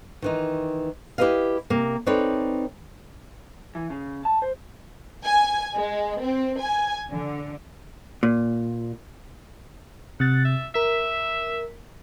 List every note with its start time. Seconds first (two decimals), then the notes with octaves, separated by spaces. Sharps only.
0.22 D#3 E3 D#4
1.18 E4 G4 A4 B4 D#5 F5
1.70 C3 A#3
2.06 C4 D#4 A4 B4 C#5 D5
3.75 E3
3.90 C#3
4.25 A5
4.42 C5
5.24 G#5
5.75 G#3
6.20 C4
6.59 G#5
7.11 D3
8.23 A#2
10.20 C3 F#5 A6
10.45 E5
10.74 A#4 E5 B6